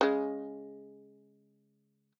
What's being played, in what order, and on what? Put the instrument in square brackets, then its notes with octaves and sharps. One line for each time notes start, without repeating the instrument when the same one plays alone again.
[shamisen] C#3 G#3